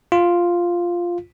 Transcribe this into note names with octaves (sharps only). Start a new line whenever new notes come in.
F4